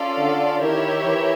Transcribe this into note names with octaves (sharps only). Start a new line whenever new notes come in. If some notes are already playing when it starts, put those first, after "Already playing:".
Already playing: C#4 F4 A4 D5 F5
D3
D#3 E4 G4 A#4 C#5 E5
E3